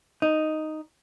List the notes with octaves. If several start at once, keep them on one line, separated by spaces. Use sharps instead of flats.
D#4